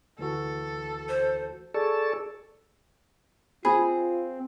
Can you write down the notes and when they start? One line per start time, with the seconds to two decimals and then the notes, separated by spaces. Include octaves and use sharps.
0.19 D2 E3 F#4 A4
1.09 C5
1.74 G#4 A4 D5 A5 C#6 E6
3.65 C4 F4 G#4 B5